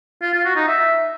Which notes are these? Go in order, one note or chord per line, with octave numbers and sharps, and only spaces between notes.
F4
F4
F#4
D#4
E5